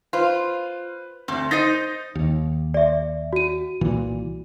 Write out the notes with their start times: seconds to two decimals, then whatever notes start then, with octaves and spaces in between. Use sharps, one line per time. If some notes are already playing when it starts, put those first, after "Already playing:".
0.13 F4 B4 C5
1.28 D2 C4
1.51 D#4 C5 D#5 D#6 A6 A#6
2.15 D#2
2.74 D5 E5
3.33 F#4 D#7
3.81 C2 A#2 E3